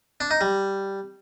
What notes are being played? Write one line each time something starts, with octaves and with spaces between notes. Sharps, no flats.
D4
D#4
G3